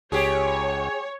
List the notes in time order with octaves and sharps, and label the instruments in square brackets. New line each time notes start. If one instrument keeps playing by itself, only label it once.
[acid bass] C#2 [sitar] G4 G#4 [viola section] C#5